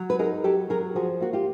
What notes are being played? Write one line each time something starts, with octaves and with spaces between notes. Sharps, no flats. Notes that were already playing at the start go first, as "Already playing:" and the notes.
Already playing: F#3
B4
D#4 G#4 A#4
F#3 G4 A4
F#3 G#4 A#4
F3 F#4 G#4
A#3 F#4
F4 G4